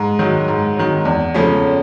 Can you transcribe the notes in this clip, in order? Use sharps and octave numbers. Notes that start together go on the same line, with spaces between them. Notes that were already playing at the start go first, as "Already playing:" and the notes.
Already playing: G#2
D#3 F#3
G#2
D#3 F#3
E2
C#3 F3 A3 C#4